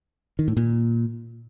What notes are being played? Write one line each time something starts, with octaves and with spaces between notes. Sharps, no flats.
D#3
A2
A#2